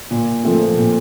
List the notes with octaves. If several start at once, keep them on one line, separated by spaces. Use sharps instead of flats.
A#2
F3 A3 C4
A#2